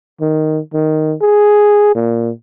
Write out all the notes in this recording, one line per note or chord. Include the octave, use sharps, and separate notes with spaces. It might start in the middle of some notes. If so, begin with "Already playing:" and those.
D#3
D#3
G#4
A#2